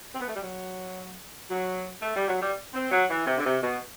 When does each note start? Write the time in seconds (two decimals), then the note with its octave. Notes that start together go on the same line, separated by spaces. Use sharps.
0.13 C4
0.20 B3
0.28 A3
0.35 G3
0.42 F#3
1.49 F#3
2.02 A3
2.16 G3
2.28 F#3
2.42 G3
2.73 C4
2.91 F#3
3.10 E3
3.26 C3
3.38 D3
3.45 C3
3.63 B2